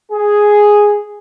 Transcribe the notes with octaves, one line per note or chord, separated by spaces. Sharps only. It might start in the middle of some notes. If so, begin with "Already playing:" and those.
G#4